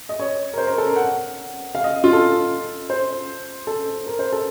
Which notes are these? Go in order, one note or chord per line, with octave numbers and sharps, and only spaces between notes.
D#5
C#5
A#4
C5
A#4
A4
A#4
F#5
F5
D#5
F4
A4
C5
A4
A#4
C5
A4